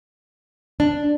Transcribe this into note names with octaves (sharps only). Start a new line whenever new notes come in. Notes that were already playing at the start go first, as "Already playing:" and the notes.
D4